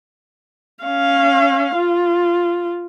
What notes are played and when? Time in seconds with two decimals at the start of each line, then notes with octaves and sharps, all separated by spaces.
0.84 C#4 F5
1.76 F4